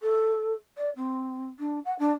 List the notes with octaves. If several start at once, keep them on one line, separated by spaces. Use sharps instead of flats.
A4
D5
C4
D4
F#5
D4